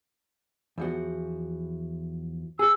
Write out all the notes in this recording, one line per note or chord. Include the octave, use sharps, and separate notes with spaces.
E2 F3 F#4
G#4 E6